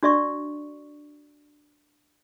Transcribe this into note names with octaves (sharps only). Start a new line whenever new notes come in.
D4 F#4 D5 E5 C#6